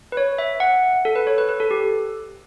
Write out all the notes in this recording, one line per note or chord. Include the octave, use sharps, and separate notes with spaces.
B4
C#5
E5
F#5
A4
B4
C#5
B4
B4
A4
G4